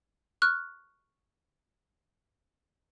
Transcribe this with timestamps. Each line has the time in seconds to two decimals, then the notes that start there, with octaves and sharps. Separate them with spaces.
0.42 C#6 F6 F#6